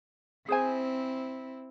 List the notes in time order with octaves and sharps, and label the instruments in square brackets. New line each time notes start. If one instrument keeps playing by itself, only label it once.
[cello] C4 E4 [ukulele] G#4 C5 G#5